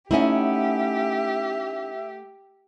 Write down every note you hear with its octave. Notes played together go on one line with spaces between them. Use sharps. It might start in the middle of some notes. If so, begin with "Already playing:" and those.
A3 C#4 D#4 E4 G4 E5 F#5 G#5